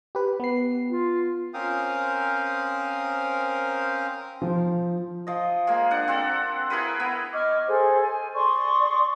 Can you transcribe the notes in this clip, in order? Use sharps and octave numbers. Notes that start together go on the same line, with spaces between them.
G4 B4
B3 C7
F4
C4 C#4 A#4 C5 F5 D#6
F3
F3 D#5
G#3 A#3
D4 F#5
C4 A4 F#5
E4 G#4 A#4 B4
B3
D#5 C#6 D6 F6
G#4 A4 C5
G#5
D5 C6 C#6 D#6